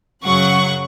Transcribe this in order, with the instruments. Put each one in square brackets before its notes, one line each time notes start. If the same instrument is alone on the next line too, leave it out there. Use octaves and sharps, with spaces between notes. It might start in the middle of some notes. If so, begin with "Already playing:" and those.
[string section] F#2 C#3 F#3 F#5 C#6